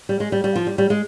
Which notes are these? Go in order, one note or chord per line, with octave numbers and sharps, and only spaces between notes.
G3
G#3
G3
G3
F3
G3
G3
G#3